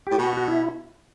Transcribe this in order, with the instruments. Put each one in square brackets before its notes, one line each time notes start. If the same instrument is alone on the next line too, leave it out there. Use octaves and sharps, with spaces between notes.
[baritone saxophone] A2 [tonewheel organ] G4
[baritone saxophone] B2 [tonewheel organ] F#4
[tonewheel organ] F#4
E4